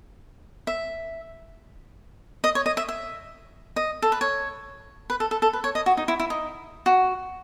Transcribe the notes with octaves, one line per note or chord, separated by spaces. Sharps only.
E5
D#5
C#5
D#5
E5
E5
D#5
A4
B4
C#5
B4
A4
A4
A4
B4
C#5
D#5
F#4
D#4
E4
E4
D#4
F#4